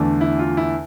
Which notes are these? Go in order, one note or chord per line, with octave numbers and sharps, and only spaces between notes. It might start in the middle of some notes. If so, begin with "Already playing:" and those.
Already playing: E2 D3 A3 D4
E4
F4
E4